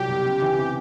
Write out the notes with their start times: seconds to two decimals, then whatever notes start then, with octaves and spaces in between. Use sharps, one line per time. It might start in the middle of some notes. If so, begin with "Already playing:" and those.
Already playing: C2 F#3 G4
0.09 B2
0.25 C#2
0.42 E3
0.58 C3